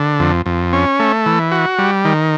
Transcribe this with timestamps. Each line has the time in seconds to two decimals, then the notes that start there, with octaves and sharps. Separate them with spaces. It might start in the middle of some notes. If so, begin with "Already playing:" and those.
Already playing: D3
0.20 F2
0.46 F2
0.73 C#4
1.00 A3
1.26 E3
1.52 F#4
1.79 G3
2.05 D#3